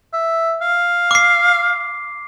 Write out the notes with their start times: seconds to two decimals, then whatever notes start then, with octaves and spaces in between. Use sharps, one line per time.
0.13 E5
0.61 F5
1.11 D6 C7